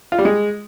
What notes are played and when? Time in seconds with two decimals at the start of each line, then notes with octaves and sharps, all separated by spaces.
0.12 F4
0.18 G3
0.25 G#3